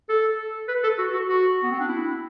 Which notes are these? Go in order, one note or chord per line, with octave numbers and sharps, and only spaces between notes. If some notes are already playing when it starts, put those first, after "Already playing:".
A4
B4
A4
F#4
F#4
F#4
B3
C4
D4
E4